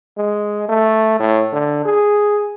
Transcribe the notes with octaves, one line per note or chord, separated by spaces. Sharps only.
G#3
A3
A2
D3
G#4